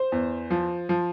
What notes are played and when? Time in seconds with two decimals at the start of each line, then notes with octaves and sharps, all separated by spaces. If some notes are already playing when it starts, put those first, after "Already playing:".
Already playing: C5
0.12 E2
0.50 F3
0.89 F3